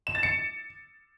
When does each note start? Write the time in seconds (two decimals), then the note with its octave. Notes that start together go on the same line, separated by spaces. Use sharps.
0.07 E7
0.15 A6
0.23 C#7